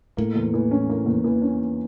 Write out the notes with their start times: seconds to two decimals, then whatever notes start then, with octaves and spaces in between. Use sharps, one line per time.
0.17 A2 A#3
0.36 E2
0.54 E3
0.71 C#4
0.89 A#3
1.06 E2
1.24 E3
1.42 C#4